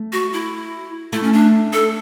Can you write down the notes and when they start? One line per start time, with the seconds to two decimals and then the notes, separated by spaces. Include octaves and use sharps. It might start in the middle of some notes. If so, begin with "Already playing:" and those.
Already playing: A3
0.12 F#4
0.33 E4
1.13 A3 E4
1.23 C#4
1.33 D4
1.73 A4